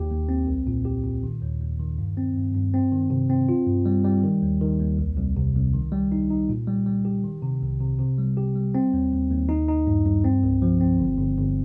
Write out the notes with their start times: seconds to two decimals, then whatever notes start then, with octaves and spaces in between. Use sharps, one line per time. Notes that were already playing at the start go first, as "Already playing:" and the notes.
Already playing: D#2 G4
0.10 D#2
0.29 C4
0.47 C2
0.67 A#2
0.85 G4
1.04 A#2
1.23 D#3
1.42 D#2
1.61 D#2
1.79 D#3
1.98 G2
2.17 C4
2.36 G2
2.54 G2
2.74 C4
2.92 D#3
3.10 C3
3.30 C4
3.49 F4
3.67 G2
3.86 G3
4.05 G3
4.24 D#3
4.42 D#2
4.61 D#3
4.80 D#2
4.99 C2
5.17 C2
5.36 C3
5.55 C2
5.74 D#3
5.92 G3
6.12 D#4
6.30 D#4
6.49 A#2
6.67 G3
6.86 G3
7.05 G4
7.24 D#3
7.42 C3
7.62 C2
7.80 C3
7.99 C3
8.18 G3
8.37 G4
8.56 G3
8.75 C4
8.93 D#2
9.12 D#2
9.30 D#2
9.49 D#4
9.68 D#4
9.87 G2
10.06 G2
10.25 C4
10.43 C2
10.62 F3
10.81 C4
10.99 G1
11.18 G1
11.37 G1